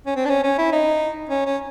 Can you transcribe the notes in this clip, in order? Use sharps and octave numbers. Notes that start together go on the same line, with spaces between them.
C#4
C4
D4
C#4
C#4
E4
D#4
C#4
C#4